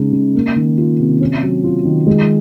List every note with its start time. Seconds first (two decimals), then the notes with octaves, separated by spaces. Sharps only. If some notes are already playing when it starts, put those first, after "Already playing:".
Already playing: C#3 G#3 D#4
0.12 C#3
0.35 A#3
0.56 D#3
0.78 F4
0.99 C3
1.21 C#4
1.43 F#3
1.64 F4
1.85 D#3
2.07 G#3